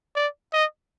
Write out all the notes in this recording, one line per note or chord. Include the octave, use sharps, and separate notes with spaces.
D5
D#5